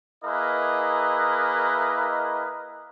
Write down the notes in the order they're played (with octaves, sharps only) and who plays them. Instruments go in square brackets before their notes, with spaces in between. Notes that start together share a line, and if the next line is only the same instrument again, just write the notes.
[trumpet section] A#3 E4 G#4 A#4 B4 D#5